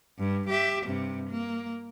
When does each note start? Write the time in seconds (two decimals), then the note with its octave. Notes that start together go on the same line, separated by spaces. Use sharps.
0.19 G2
0.50 G4 E5
0.86 G2 C3
1.30 A#3